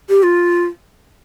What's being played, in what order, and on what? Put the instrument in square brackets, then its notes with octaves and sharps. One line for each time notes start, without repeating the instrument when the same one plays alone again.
[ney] G4
F4